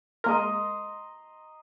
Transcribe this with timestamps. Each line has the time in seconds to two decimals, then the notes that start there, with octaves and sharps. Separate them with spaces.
0.24 G#3 A#3 A#4 D#5 A#5 C6